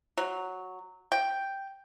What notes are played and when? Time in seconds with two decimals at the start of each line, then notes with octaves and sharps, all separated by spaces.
0.18 F#3
1.12 G5